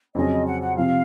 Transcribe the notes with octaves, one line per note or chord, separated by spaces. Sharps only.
F2 C#3 F#3 C#4 G#4 D#5
F#5
F#5
C3 F3 C4 F5